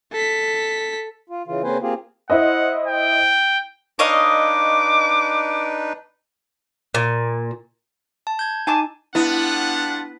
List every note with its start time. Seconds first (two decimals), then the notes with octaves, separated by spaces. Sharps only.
0.12 A4 B6
1.30 F4
1.47 C#3 E3 F4
1.64 C#3 A#3 C4 B4 C5 G#5
1.82 A#3 C4 F4 G4 G#4
2.30 E4 C5 D#5 F#5
2.87 G5
3.99 D4 D#4 B4 C#5 D#5 F5 D6
6.95 A#2
8.27 A5
8.39 G6 G#6
8.67 D#4 G#5 A5 D6
9.15 G3 B3 D4 E4 F4 E5 F#5